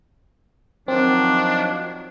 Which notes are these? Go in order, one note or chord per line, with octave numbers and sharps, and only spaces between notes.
D#3 F3 F#3 C4 D4